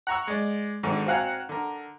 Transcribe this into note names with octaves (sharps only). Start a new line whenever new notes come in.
F#5 A#5 C#6 E6
G#3 D5
G#1 G#2 D3
C4 F#4 F5 F#5 G#5 A#5
D3 A#4